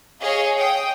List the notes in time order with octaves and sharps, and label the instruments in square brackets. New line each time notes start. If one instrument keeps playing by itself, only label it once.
[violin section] G#4 C#5 D#5 F5
G5 D#6